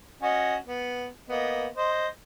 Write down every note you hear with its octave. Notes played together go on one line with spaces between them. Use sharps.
C#4 F#4 D#5
B3
A#3 B3 D#5
C5 D#5